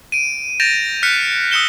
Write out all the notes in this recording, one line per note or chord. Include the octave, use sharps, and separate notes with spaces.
D7 D#7
G6 A6 A#6 D7 E7 F7
F6 F#6 B6 C#7
D#6 E6 F#6 C#7 E7 G7